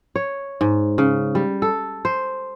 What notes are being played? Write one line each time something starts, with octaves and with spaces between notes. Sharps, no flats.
C#5
G#2
C#3
G3
A4
C5